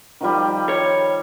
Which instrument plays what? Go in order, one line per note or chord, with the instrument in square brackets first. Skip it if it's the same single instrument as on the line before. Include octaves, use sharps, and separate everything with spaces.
[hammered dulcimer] D#3 F3 G3
[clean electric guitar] C#5